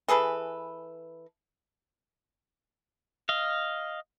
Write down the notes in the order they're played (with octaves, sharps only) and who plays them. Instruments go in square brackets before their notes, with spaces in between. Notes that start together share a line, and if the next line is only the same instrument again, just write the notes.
[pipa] E3 G#4 A4 B4
[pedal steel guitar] D#5 F5